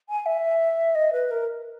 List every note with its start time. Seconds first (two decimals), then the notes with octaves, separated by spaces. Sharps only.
0.09 G#5
0.26 E5
0.95 D#5
1.12 B4
1.31 A#4